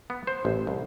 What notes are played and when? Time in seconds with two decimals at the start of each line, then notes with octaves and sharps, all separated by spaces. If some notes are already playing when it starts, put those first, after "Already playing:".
0.10 B3
0.27 C5
0.45 A1
0.67 C2